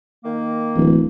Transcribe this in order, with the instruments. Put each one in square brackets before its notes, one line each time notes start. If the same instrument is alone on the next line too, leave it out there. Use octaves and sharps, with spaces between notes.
[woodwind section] D#3 A#3
[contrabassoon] D1 [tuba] E3